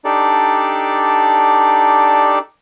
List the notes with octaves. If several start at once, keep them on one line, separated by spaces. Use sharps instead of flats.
D4 D#4 G4 A4 D5